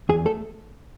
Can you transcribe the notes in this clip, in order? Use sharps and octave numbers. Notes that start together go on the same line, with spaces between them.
E2 G#4
A3 A4